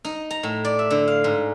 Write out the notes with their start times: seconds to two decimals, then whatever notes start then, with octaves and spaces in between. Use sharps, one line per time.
0.05 D#4
0.31 A#5
0.43 A2
0.65 D5
0.79 E5
0.90 D3
1.08 F5
1.24 G#2